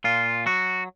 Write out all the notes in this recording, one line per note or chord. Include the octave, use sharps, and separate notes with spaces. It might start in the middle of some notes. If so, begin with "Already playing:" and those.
A#2 F4
F#3 F#4